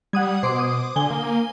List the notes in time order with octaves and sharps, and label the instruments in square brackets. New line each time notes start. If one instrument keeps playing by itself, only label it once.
[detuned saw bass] G3 [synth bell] F#5 D#6 G#6
[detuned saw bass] B2 [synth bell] C5 C6 D6
[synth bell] D6 D#6
[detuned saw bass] D3 [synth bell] G#5 G7
[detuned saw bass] A#3